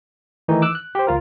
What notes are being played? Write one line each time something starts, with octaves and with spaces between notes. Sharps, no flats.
D#3 E3 A3 D#4
D6 E6 F#6
F#6
G4 C5
C#2 F4 A#4